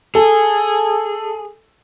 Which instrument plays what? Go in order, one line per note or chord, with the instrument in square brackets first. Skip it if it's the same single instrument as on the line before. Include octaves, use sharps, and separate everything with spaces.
[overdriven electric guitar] G#4 [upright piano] A4